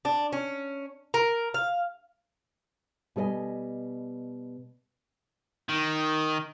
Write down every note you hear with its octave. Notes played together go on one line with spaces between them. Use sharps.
D4
C#4
A#4
F5
B2 G3 G#4 D5 D#5 G#5
D#3